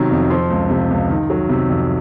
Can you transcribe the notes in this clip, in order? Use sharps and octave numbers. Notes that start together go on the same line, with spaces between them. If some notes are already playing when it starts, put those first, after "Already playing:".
Already playing: C3 D#3 F#3 A#5
F2
F3 C6
C#2
C3
C#2
D#3
F#3
C3
F2